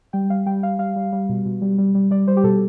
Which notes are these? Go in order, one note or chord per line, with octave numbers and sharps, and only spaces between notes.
G3 G5
G3 F5
G3 G5
G3 F5
G3 F5
G3
G3
B2
B2
G3
G3
G3
G3 D5
G3 C5
G4
B2 A4